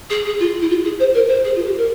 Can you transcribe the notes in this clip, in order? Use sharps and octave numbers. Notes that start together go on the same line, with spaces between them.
G#4
G#4
F4
E4
F4
G#4
C5
A#4
C5
G#4
F4
G4
A#4